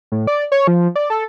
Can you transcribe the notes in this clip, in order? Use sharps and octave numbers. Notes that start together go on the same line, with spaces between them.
A2
D5
C#5
F3
D5
A4